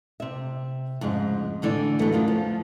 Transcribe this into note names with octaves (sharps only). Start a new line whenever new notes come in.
C3 E5
F2 G#2 C#3 G#3
A2 D3 E3 D5
F#3 G#3 A3 B3
F#2 D#3 F4
F3